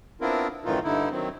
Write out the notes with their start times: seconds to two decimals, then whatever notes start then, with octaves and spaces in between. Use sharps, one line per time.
0.21 B3 C4 D4 E4 F4 A#4
0.65 F#2 A2 D#3 E3 D#4 F4
0.84 G2 D3 D#4 E4
1.11 D#3 F#3 C4